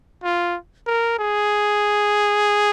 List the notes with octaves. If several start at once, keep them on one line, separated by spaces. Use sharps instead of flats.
F4
A#4
G#4